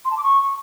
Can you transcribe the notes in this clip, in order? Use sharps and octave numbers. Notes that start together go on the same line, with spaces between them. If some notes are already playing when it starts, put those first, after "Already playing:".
C6
A5
D6
C#6